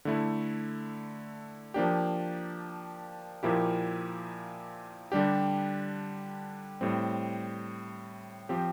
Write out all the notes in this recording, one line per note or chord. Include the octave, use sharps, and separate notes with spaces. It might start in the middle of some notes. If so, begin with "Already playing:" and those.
D3 A3 E4
F3 A#3 D4 G4
A#2 F3 A#3 E4 G4
D3 G3 D4 G4
A2 G3 C4
F3 C4 G4